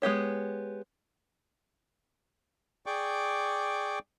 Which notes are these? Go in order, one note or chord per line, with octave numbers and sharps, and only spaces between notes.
G#3 B3 G4 C#5
G#4 D5 G5 C#6 D6